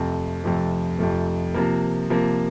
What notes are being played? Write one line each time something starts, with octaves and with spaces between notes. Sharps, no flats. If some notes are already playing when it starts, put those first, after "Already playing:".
Already playing: F2 C3 F3 A3
F2 C3 F3 A3
F2 C3 F3 A3
C3 F3 A#3
C3 F3 A#3